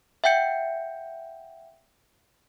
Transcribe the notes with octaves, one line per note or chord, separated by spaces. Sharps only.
E5 F#5 G5 G6 C#7